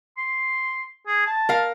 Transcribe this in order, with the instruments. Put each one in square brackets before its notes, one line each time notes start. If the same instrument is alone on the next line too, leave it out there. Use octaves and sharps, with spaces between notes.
[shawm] C6
G#4
A5
[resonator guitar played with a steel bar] A#4 F5